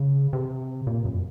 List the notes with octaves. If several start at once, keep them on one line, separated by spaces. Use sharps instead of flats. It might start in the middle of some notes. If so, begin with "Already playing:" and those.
Already playing: C#3
C3
A#2
F#2